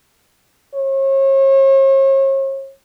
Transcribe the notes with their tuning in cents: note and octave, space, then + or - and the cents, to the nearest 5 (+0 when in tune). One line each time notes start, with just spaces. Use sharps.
C#5 -40